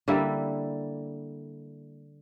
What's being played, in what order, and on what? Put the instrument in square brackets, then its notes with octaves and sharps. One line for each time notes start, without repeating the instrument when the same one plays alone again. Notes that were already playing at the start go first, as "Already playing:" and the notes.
[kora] D3 G3 A#3 E4